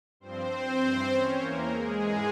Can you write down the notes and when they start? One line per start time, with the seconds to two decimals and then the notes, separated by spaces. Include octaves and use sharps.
0.20 G2 F3 C4 C5
0.80 G2 E3
1.10 C#4 C#5
1.40 E2 E3 A#3 A#4
1.70 G#3 G#4
2.01 G#2 E3